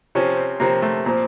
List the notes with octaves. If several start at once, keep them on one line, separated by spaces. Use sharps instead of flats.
C3 F3 C#4
C4
C3 F3 A#3
A3
A#2 F3 C4